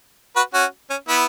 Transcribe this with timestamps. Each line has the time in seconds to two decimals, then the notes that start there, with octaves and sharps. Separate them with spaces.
0.36 F#4 B4
0.54 C#4 F#4
0.90 C#4
1.08 B3 E4